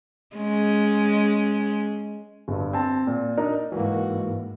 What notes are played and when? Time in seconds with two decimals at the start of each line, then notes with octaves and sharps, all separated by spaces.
0.36 G#3 C#4
2.48 G1 G2
2.73 C4 A5
3.07 A#2
3.37 D4 D#4 A#4
3.72 G#2 E3 A#3 F#4